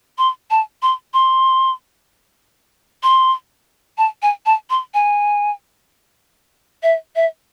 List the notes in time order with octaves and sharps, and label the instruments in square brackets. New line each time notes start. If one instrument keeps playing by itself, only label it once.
[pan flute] C6
A5
C6
C6
C6
A5
G#5
A5
C6
G#5
E5
E5